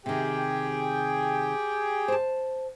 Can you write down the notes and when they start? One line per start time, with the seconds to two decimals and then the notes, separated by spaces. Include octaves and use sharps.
0.06 C3 D#3 G4 G#4 G5
2.08 C5 A5